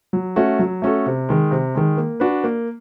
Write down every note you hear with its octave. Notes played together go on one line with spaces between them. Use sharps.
F#3
A3 C#4 F#4 A4
F#3
A3 C#4 F#4 A4
C3
D#3 G#3
C3
D#3 G#3
A#3
D4 F#4 B4
A#3